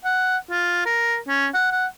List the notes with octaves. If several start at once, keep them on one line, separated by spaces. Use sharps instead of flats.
F#5
F4
A#4
C#4
F#5
F#5